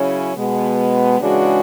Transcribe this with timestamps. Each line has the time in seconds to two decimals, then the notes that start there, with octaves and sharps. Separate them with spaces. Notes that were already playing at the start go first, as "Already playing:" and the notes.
Already playing: C#3 F#3 C#4 E4
0.36 B2 G#3 B3
1.20 C#3 E3 G#3 D4 F#4